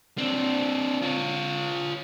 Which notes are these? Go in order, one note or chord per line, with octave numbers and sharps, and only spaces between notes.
C4 D4
F4 C#5